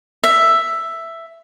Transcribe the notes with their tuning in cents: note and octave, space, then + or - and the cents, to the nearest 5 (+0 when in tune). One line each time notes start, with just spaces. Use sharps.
E5 +5